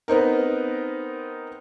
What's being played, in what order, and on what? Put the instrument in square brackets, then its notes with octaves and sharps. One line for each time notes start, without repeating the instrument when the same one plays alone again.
[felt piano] B3 C4 D#4 A#4